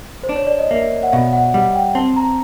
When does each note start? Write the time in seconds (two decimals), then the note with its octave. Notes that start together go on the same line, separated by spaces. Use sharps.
0.23 C5
0.29 D4
0.36 C#5
0.47 D5
0.59 D#5
0.71 A#3 E5
1.03 F#5
1.12 B2 F5
1.33 F#5
1.54 G3 F#5
1.75 G5
1.95 C4 A5
2.16 A#5